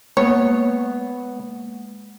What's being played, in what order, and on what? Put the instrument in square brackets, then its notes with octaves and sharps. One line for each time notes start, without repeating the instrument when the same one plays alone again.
[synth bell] G#3 A#3 [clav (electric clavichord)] B3 [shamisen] C#5